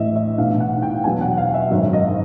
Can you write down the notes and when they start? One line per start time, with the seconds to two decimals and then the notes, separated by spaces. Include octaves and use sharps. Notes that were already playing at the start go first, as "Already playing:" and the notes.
Already playing: A1 A2 E3 D#5 E5
0.15 E5
0.38 B1 A2 E3 F5
0.60 F#5
0.82 G5
1.04 E2 B2 F#3 G#5
1.21 F#5
1.37 F5
1.54 E5
1.70 G#1 F#2 D#3 F#3 E5
1.93 D#5